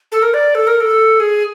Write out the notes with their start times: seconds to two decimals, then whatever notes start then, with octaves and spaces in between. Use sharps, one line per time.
0.12 A4
0.22 A#4
0.34 D5
0.55 A4
0.67 A#4
0.80 A4
1.20 G#4